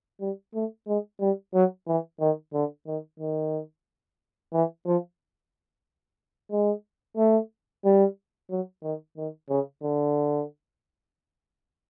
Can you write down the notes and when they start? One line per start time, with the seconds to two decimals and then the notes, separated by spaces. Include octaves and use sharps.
0.21 G3
0.54 A3
0.87 G#3
1.21 G3
1.54 F#3
1.87 E3
2.20 D#3
2.54 D3
2.87 D#3
3.20 D#3
4.53 E3
4.86 F3
6.52 G#3
7.17 A3
7.85 G3
8.50 F#3
8.83 D#3
9.17 D#3
9.50 C#3
9.83 D3